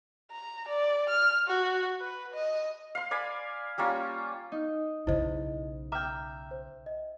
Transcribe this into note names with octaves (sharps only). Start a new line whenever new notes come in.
A#5
D5
F6
F#4
B4
D#5
F5 C6
D5 F5 G#5 B5
G3 A#3 C#4 F4
D#4
B1 C#3 E4 C5 D#5
E5 G5 A#5 D6 F6
C5
D#5